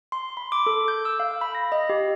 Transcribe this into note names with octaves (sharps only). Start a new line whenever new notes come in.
C6
B5
D6
A4
G6
E6
F5
B5
A#6
D#5
G4